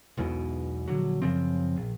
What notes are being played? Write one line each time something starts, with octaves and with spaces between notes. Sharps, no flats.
B1 E2 G#2 B2
A#1 D3 F#3
F#2 C#3 F3 C4
A#1